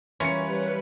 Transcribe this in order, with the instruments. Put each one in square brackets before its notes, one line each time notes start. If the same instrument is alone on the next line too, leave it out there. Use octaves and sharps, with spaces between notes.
[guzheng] E3 F4 A#4 [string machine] G3 B4 [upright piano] C#4 C#7 [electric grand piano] C#5